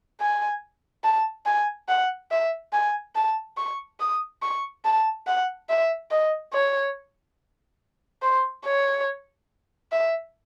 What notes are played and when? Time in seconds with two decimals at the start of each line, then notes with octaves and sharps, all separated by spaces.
0.20 G#5
1.04 A5
1.46 G#5
1.88 F#5
2.31 E5
2.73 G#5
3.15 A5
3.57 C#6
4.00 D#6
4.42 C#6
4.85 A5
5.27 F#5
5.69 E5
6.11 D#5
6.53 C#5
8.22 C5
8.65 C#5
9.92 E5